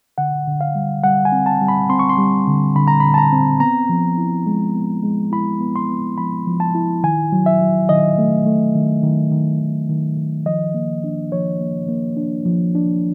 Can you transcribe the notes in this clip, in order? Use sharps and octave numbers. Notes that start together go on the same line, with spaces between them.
D3 F#5
D3
F5
G3
G3 F#5
G#5
C4
A5
G3
B5
C4 C6
C#6
C6
G3
D3
D3 B5
A#5
B5
D3
A5
A#5
C4
B3 A#5
F3
E4
G#3
B3
G#3
E4 B5
B3
C6
B3
F3 B5
F3
A5
E4
D#3 G#5
F#3
E5
F#3
D#3 D#5
A3
A3
D#3
D#3
D#3
D#3
D#3
D#3
F3 D#5
A#3
D4
F3 C#5
A#3
A#3
D4
F3
D4